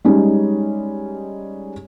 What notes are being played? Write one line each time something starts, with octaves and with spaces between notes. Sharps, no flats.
G3 G#3 C#4 D#4